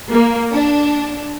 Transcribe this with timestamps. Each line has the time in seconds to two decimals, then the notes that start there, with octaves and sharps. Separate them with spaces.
0.11 A#3
0.54 D4